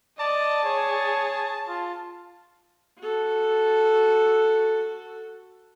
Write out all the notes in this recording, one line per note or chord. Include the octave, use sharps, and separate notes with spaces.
D5 D#5 A5
G#4 C#5
F4
F#4 A4